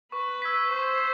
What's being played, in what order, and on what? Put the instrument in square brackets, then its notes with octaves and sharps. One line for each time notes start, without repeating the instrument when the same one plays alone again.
[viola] B4 [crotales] C#6
[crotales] E6 G#6 B6
[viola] C5 [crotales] C#6